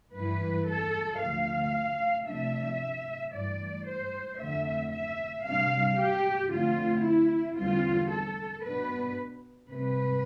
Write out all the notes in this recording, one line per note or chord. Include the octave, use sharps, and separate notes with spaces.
G2 E3 G3 B4
A4
D2 D3 F3 A3 F5
C3 F3 A3 D4 E5
G2 E3 A3 D5
C5
F2 D3 A3 E5
E5
C3 G3 D4 F5
G4
F2 D3 A3 C4 F4
E4
E2 D3 G3 C4 F4
A4
B2 B3 D4 B4
C3 G3 C4 B4